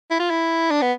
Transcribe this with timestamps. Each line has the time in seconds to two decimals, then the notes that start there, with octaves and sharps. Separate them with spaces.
0.10 E4
0.20 F4
0.30 E4
0.71 D4
0.81 B3